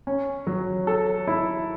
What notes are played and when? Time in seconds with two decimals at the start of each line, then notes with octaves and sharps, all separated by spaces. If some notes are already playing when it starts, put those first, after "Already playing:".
0.07 C#4
0.47 F#3
0.87 A4
1.27 E4